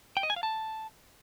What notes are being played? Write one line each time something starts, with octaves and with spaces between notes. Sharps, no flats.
G5
D#5
G#5
F5
A5